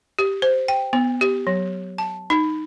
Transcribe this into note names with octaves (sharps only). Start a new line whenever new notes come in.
G4
C5
G5
B3
G4
F#3
A5
D#4